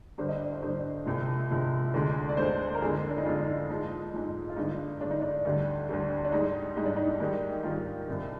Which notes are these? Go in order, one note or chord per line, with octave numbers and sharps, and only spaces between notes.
G2 D3 G3 C5
D#5
D5
C5
G2 D3 G3 C5
C2 C3 F3 G#3
C2 C3 F3 G#3
D2 D3 G#3
D5
D2 D3 G#3 C5
A#4
F2 D3 G#3 G#4
D4
D#4
F2 D3 G#3 F4
D#4
F4
G#2 F3 G#3 D#4
G#2 F3 G#3
F4
G2 D3 G#3 D#4
G2 D3 G#3 D4
D#4
D4
D2 D3 G3
D2 D3 G3
D4
G#2 G3 D#4
G#2 G3 D#4
D4
D#4
G#2 D#3 G3
G#2 D#3 G3 F4
C2 C3 G3